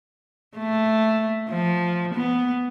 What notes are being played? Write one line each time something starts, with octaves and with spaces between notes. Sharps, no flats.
A3
F3
B3